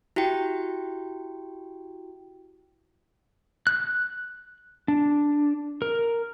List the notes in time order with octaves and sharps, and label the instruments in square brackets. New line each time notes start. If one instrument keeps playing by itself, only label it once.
[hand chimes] E4 F#4 G4 G5
[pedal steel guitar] F#6
D4
A#4